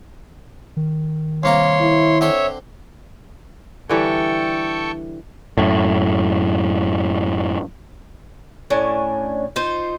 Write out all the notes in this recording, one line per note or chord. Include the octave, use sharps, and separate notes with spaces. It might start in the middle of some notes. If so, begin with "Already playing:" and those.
D#3
C2 A#3 C#5 A#5 C6
E4
D3 C4 C#5 E5 C6
D3 E3 G3 A4 G5 C#6
F#2 A2
A2 C#4 D4 G#5
D#4 F4 C5